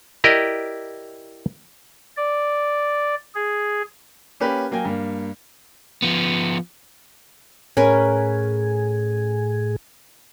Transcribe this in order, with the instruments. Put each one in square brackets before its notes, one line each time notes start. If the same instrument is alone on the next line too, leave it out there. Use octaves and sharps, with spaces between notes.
[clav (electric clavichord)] E4 G4 A#4 D5 D#5
[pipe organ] D5
G#4
[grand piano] A#3 C#4 G4 B4
F#3 A#3 G5 G#5
G2 A#3
[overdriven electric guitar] F3 B3
[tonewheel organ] A2 G#4 [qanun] C#4 A#4 B4